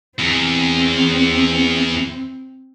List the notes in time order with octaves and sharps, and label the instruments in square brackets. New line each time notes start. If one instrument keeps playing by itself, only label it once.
[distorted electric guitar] E2 [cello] C4